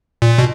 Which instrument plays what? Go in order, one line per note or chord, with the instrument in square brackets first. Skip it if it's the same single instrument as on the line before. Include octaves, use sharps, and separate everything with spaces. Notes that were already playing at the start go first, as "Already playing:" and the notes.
[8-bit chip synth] A#2
B2